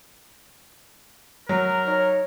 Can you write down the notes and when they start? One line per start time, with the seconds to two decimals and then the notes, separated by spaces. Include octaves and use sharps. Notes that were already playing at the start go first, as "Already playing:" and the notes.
1.49 F#3 A#4
1.86 D#4 C#5